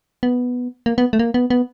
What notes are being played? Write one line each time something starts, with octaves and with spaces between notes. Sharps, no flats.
B3
A#3
B3
A3
A#3
B3
B3